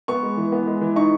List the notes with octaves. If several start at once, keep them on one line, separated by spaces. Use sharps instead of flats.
B3 C#6
G#3
E3
B3
G#3
E3
D#4 C#6